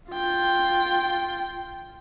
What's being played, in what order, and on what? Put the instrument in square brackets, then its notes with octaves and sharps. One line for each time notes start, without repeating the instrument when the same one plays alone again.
[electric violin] F4 G5